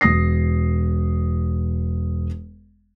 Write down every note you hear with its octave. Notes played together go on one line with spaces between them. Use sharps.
E1 D#6 A#6 C7